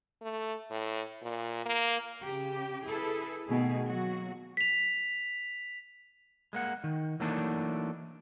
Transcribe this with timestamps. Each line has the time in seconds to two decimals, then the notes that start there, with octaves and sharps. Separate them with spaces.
0.22 A3
0.70 A2
1.22 A#2
1.66 A#3
2.23 C#3 G4
2.86 E4 G#4 A4 B4
3.49 B2 D#3 A3 G#4
3.86 F#3 A#3 F#4
4.57 B6 F7
6.53 G#3 A#3 F#5
6.84 D#3
7.20 E3 F#3 A3 A#3 D4 D#4